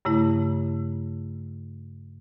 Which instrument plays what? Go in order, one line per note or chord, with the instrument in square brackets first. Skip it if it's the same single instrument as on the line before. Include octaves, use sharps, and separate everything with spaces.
[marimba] G2 C#3 A3 E4